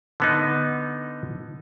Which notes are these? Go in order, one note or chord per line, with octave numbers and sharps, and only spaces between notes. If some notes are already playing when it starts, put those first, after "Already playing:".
D3 B3 D#4